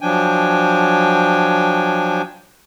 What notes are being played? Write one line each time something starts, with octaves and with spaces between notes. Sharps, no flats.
F3 F#3 D4 G5 G#5